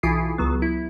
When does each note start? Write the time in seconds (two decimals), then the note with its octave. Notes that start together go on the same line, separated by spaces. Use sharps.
0.03 B1 E3 E4 F4 D#6 C7
0.38 C#2 F#3 B3
0.62 E4